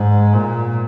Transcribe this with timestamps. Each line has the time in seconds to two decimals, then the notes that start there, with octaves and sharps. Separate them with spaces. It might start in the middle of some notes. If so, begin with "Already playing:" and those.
Already playing: G#2
0.34 A#2